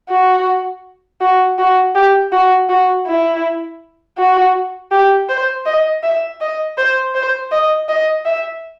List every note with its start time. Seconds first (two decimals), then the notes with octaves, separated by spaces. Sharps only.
0.09 F#4
1.21 F#4
1.58 F#4
1.95 G4
2.32 F#4
2.69 F#4
3.06 E4
4.17 F#4
4.91 G4
5.29 C5
5.66 D#5
6.03 E5
6.40 D#5
6.77 C5
7.14 C5
7.51 D#5
7.88 D#5
8.25 E5